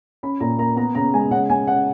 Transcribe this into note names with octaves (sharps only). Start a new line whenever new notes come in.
C#4 B5
A#2 A#5
A#3 A#5
B3 A#5
C#3 A#5
G#3 G#5
C#3 F#5
C#3 G#5
C#4 F#5